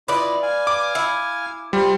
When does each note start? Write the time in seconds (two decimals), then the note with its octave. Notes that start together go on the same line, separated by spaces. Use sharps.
0.08 E4 F4 B4 D5 D#5
0.43 F5 G#5
0.67 D6
0.95 E4
1.73 G3 F4 C5 C6